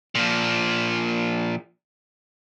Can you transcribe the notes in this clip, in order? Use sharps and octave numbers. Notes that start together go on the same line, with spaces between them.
A#2 F3